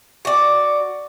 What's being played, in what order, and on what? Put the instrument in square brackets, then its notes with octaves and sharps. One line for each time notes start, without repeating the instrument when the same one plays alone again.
[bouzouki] F#4 D5